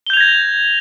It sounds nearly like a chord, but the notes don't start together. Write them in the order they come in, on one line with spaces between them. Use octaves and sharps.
G7 G6 F7 G#6 A#6